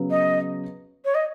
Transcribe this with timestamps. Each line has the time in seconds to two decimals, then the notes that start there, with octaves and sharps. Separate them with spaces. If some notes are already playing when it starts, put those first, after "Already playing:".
Already playing: C#3 F#3 B3
0.10 D#5
1.05 C#5
1.15 D#5